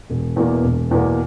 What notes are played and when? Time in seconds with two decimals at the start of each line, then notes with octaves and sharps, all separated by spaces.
0.10 E1
0.36 E2 B2 A#3
0.64 E1
0.91 E2 B2 A#3